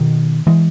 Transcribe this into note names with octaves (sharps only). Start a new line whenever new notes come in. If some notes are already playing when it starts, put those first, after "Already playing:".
Already playing: B2 D#3
E3 G#3